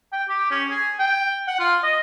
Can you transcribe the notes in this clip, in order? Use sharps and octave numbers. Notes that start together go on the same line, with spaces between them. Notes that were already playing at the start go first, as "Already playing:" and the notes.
G5
G4
C#4
G#4
G5
F#5
F4
D#5